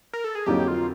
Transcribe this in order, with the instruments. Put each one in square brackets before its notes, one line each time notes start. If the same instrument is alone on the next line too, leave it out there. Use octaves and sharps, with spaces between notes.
[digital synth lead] A#4
A4
G#4
[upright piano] F2 D3 F#3 A#3 D#4 [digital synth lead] G4
[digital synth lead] F4